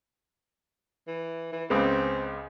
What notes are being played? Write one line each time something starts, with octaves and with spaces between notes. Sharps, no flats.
E3
E3
C#2 C#3 B3 C4